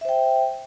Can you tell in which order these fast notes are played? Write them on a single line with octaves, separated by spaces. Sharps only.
E5 C5 G5